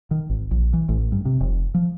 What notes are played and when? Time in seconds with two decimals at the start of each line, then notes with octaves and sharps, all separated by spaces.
0.11 D#3
0.30 G#1
0.51 A#1
0.73 E3
0.89 A1
1.12 G2
1.25 C3
1.41 F1
1.74 F3